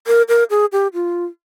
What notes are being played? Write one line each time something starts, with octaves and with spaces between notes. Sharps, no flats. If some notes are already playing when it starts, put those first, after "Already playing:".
A#4
A#4
G#4
G4
F4